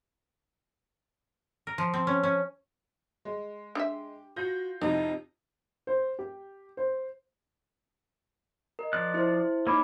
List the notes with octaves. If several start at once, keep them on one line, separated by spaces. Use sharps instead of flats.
A#4
F3
C4
C#4
C#4
G#3
D4 G4 E5
F4 F#4 G6 A#6
F2 C3 E3 D#4
C5
G4
C5
A#4 D#5
F3 D5 F#6
E4 C5
A#3 D#4 C#5 B5 D6